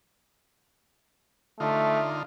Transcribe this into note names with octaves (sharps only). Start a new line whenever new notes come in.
D3 A3 D#4 F4